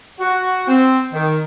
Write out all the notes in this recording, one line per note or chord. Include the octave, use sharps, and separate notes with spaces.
F#4
C4
D#3